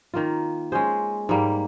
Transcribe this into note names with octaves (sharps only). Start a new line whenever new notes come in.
D#3 A#3 F4
G#3 C#4 G#4 C5
G#2 G3 A#3